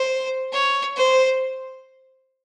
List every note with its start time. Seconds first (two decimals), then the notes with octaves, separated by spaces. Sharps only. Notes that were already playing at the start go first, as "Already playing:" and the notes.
Already playing: C5
0.53 C#5
0.96 C5